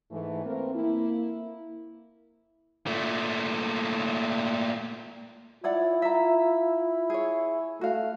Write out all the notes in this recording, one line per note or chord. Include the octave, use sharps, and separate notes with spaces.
G#2 E3 A3
A3 A#3 C4 A#4
A#3 E4
A#2 A3
E4 F4 C#5 D5 F#5
E5 A#5
G#4 C#5
A3 F#4 F5